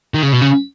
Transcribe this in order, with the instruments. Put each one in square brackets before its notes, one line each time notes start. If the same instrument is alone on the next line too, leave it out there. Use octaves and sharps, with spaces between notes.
[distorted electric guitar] D#3
C#3
B2
C#3